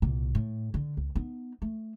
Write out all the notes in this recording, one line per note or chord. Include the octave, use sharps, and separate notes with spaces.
C2 A#2
A2
D3
C#2
B3 D#4
A3